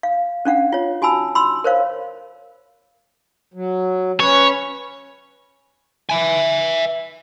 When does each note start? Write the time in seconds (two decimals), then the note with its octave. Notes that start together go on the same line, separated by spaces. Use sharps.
0.03 F5
0.45 C#4 D4 F5 F#5
0.72 F4 C#5
1.02 F#4 G#5 A5 B5 E6
1.35 B5 C6 E6
1.64 A#4 C5 C#5 F5
3.54 F#3
4.20 C#4 B4 C#5
6.09 E5 G#5